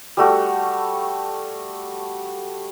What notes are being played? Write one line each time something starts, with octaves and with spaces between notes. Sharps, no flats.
G3 A3 F#4